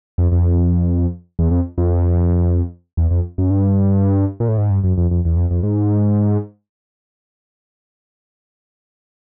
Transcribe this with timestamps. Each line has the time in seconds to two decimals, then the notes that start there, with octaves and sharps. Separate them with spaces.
0.18 F2
0.32 F2
1.39 E2
1.51 F2
1.78 F2
2.97 E2
3.11 F2
3.38 F#2
3.50 G2
4.40 A#2
4.48 A2
4.58 G#2
4.70 G2
4.84 F#2
4.97 F2
5.11 F2
5.25 E2
5.36 F2
5.51 F2
5.63 G#2